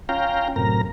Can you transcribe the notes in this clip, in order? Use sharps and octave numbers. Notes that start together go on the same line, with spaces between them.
C#4 F4 F5 G5 A#5
F#2 A2 C3 A#4 A#5